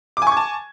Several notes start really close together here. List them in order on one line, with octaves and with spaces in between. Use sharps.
D6 G#5 C#6 G#6 A5